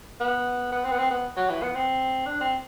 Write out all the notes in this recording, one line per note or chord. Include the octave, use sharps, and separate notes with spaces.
B3
B3
C4
B3
C4
B3
F#3
E3
B3
C4
D4
C4